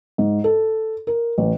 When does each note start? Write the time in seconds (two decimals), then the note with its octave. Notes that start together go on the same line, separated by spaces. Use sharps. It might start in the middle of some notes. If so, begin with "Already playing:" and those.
0.18 G#2
0.44 A4
1.07 A#4
1.38 A1